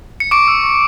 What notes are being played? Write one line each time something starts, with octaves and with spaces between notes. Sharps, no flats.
C#7
C#6 D6 D7
E6
C#6